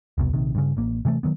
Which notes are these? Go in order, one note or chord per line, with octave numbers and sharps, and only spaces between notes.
E1 C2 B2
A#1 C3 D#3
G2 C#3
A1 A#3
C3 E3 G3 A3
D#3 F#3 B3